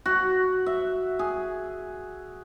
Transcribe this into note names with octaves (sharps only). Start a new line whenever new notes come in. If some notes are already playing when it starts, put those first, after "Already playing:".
F#4
E5
G#4